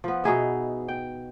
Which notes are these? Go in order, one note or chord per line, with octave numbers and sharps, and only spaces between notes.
F3 B3
B2 D#4 G#4 E5
G5